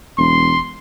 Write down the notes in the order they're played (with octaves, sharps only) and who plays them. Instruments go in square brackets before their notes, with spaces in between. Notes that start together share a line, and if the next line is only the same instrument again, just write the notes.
[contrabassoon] E1 [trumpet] C6